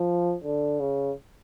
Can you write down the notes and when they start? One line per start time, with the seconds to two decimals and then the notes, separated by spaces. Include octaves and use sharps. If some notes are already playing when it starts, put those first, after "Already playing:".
Already playing: F3
0.44 D3
0.79 C#3